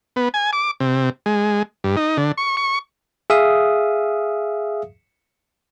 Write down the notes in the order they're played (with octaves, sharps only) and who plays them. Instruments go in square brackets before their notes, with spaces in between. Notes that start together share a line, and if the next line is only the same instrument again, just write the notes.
[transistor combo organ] B3
G#5
D6
C3
G#3
G2
D#4
D3
C#6
C#6
[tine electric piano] G#4 E5 F5 D#6